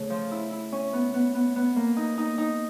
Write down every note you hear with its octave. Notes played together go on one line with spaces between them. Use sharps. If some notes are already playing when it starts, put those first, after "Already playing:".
Already playing: C#3 A3
F3
E4
E4
C#4
B3
B3
B3
B3
A#3
D#4
D#4
D#4